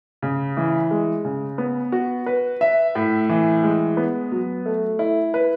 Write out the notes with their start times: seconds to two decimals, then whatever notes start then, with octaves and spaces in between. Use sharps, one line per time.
0.23 C#3
0.57 E3
0.91 G#3
1.25 C#3
1.58 B3
1.92 F#4
2.26 B4
2.61 E5
2.95 A2
3.29 E3
3.63 G#3
3.97 B3
4.32 F#3
4.66 A3
4.99 E4
5.34 B4